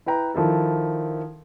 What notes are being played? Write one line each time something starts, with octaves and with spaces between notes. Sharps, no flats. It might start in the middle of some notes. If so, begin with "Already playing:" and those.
E4 B4 G5 A#5
D#3 F3 E4 A4